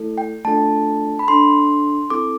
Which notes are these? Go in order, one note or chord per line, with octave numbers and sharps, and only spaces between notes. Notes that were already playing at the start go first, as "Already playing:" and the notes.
Already playing: A3 E4 A4
G5
A3 D4 F4 A4 A5
B5
D4 A4 C6
C4 E4 A4 D6